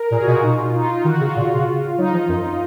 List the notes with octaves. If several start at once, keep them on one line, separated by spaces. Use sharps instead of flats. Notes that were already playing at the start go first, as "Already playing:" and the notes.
Already playing: A#4
A#2 G#4
F#4
B2
F4
B2 D#4
F4
D#4
F4
F4
D#3 F#4
C#3 F4
A#2
C#3
F#3 D#4
F3
F#2